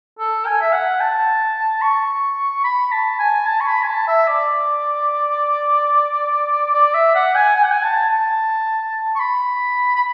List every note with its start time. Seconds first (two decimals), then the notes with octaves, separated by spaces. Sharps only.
0.19 A4
0.46 G#5
0.61 E5
0.73 F#5
1.00 A5
1.82 C#6
2.64 B5
2.92 A5
3.19 G#5
3.46 A5
3.61 C#6
3.66 B5
3.82 G#5
3.87 A5
4.07 E5
4.28 D5
6.73 D5
6.94 E5
7.15 F#5
7.35 G#5
7.56 G#5
7.63 F#5
7.71 G#5
7.83 A5
8.10 A5
9.15 C#6
9.19 B5
9.95 B5